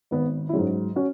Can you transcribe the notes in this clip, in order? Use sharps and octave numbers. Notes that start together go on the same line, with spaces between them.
G#1 B3
E4
F#3 G#3 C#4
G#2
C#4 F#4